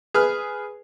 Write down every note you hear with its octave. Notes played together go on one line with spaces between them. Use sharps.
G#4 B4 F6